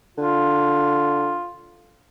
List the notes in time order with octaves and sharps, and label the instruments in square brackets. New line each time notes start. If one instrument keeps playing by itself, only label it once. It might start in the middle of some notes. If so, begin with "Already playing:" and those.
[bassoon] D3 [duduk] F4